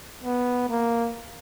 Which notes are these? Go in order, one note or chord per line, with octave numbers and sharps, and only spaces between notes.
B3
A#3